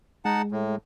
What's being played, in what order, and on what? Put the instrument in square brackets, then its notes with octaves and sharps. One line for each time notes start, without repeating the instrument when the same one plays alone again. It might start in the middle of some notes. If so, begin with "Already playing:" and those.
[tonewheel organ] G#3 [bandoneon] D#4 F#5 A5
[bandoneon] A2